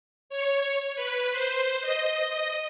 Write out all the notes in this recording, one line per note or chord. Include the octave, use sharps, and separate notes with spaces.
C#5
B4
C5
D#5